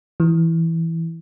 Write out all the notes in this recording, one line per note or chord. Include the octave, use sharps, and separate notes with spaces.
E3